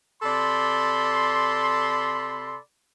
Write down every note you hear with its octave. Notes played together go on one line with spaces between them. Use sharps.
C3 A4 D5 B5 C6